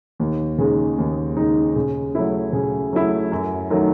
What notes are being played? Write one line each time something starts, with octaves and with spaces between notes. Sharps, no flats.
D#2
C#3 G#3 D#4
D#2
C#3 G#3 D#4
C#3
F#3 A3 E4
C#3
F#3 A3 E4
F#2
D#3 F#3 A3